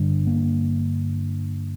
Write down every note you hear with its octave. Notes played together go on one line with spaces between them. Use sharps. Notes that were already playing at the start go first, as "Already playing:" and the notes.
Already playing: G2 D3
A#3